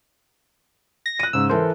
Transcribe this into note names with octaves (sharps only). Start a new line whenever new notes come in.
A#6
F#6 D#7
G#2 C#3 E6
E3 A4 A#4 C5